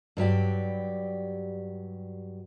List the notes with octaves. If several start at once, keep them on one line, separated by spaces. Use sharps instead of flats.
G2 F#3 G4 D5